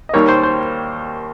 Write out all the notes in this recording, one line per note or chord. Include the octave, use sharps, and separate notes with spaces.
D#5
D#2 D#3 G3 A#3 C#5
C5
C5